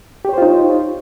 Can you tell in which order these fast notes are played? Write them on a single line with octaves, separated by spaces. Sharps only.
G4 C#5 C5 F4 D#4